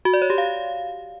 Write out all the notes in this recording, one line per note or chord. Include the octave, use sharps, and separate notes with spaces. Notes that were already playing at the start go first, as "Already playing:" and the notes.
F#4
D5
C#5
G4
F5